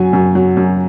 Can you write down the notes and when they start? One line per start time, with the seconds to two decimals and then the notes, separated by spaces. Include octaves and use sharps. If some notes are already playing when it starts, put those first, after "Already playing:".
Already playing: F#2 F#3 G#5
0.13 F#2
0.35 F#3
0.57 F#2